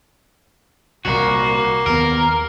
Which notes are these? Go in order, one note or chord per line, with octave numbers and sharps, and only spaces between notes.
C2 A#2 A#3 F#4
D#2 B3 A#4